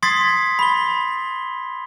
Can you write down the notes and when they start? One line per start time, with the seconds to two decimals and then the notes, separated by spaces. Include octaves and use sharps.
0.03 C6 D#6 G#6 A6 B6 C7
0.59 B5 G7